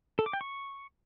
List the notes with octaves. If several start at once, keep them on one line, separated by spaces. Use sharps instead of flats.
A4
D6
G5
C#6